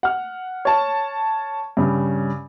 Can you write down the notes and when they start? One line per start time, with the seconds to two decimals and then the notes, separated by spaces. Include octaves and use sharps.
0.03 F#5 F6
0.65 C#5 A5
1.77 G2 C#3